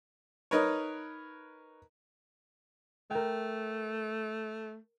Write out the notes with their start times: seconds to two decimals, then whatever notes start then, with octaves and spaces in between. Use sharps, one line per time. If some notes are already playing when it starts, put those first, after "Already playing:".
0.51 D#4 A#4 B4 C#5
3.11 A3 A#4 G5